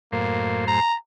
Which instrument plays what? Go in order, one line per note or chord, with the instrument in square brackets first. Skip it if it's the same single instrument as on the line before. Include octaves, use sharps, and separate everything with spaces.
[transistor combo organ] F#2 A2 C5 [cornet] A#3
[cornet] A#5